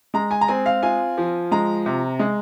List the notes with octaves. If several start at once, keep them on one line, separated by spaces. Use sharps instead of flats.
G#3 A#5
G#5
A#5
C4 G#5
F5
F4 G#5
F3
G#3 A#5
C3
G#3